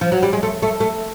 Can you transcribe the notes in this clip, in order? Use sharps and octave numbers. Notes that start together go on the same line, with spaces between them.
F3
F#3
G3
G#3
A3
A3
A3